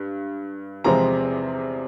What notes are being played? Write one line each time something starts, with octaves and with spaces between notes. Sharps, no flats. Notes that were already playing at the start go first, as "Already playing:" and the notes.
Already playing: G2
E2 C3 F3 G#3 C4 A#5